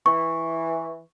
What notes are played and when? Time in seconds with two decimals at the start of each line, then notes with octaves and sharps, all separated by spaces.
0.06 E3 C#6